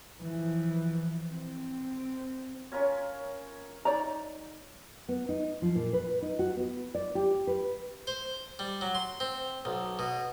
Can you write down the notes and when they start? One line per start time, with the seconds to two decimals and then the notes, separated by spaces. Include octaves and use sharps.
0.22 E3 F3
1.34 C4
2.72 C#4 F4 A#4 C#5
3.85 D#4 G#4 C#5 D5 A#5
5.09 B3
5.29 D#4
5.62 F3
5.76 A#2
5.93 B4
6.22 D#4
6.39 F#4
6.57 B3
6.95 D5
7.15 G4
7.47 B4
8.07 C5
8.59 G3
8.81 F#3
8.95 C6
9.20 C4
9.65 B1
9.99 B2